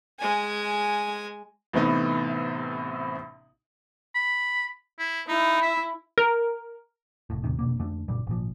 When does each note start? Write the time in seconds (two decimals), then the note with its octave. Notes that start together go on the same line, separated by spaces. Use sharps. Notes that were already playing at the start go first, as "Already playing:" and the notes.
0.19 G#3 G#5
1.73 A1 A2 C3 B3 D#4
4.15 B5
4.99 E4
5.28 D#4 E4
5.62 E5
6.18 A#4
7.30 F1 A2
7.44 D#2 A2 C3 D#3
7.59 F1 B2 D3 A#3
7.79 F2 D3 A3
8.08 F#1 A#2 D3 G3
8.27 G#1 A#2 F3